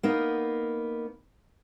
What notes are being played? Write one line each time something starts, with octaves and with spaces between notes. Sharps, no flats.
A#3 B3 D#4